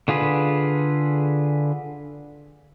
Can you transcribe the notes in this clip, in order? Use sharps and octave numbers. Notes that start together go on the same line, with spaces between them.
D3 F4 G#4 B4